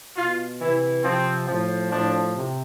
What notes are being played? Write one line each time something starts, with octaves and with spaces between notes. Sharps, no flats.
B2 F4
C3 E3 E4
C3 F3 C4
A2 F3
A2 F3 D4
C3